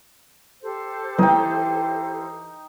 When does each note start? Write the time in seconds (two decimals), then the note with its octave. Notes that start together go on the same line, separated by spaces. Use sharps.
0.61 G4 A4 C5
1.18 E3 D#4 G5